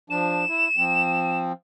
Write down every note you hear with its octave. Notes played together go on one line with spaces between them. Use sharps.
F3 D4 E7
E4
F3 C4